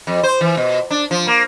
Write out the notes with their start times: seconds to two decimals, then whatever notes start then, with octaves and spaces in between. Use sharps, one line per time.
0.07 F2
0.23 C5
0.41 E3
0.57 B2
0.91 D4
1.11 F3
1.27 A#3